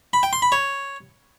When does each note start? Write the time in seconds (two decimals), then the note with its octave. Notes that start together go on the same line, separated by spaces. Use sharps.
0.13 B5
0.23 G5
0.33 C6
0.42 B5
0.52 C#5